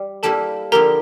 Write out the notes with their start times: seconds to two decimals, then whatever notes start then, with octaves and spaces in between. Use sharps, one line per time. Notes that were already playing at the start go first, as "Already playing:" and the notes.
Already playing: G3
0.23 G3 A#3 E4 G4 A4 A5
0.72 D3 F3 A#3 E4 G4 A#4 A#5